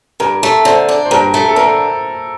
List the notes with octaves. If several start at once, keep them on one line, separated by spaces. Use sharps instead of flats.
G2 A#4
A3
D3 C5
D4
C5
G2 A#4
A3
A4
D3 A#4